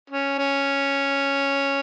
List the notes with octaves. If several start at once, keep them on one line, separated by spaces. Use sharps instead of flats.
C#4
C#4